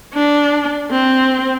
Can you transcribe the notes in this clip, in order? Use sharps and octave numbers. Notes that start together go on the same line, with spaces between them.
D4
C4